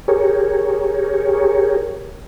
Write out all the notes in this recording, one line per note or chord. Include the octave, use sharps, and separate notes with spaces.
G4 G#4 A#4 C#5